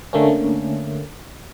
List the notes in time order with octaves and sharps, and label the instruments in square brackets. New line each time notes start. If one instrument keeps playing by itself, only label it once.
[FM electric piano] D3 A3 A#3 C#4